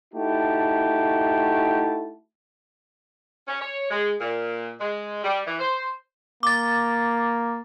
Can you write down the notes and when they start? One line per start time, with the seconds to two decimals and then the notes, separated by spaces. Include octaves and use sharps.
0.14 A3 D#4 E4 F#4 G4 A5
3.48 C#4
3.61 C#5
3.90 G#3
4.20 A#2
4.80 G#3
5.23 G3
5.47 E3
5.59 C5
6.43 A#3 D6 A6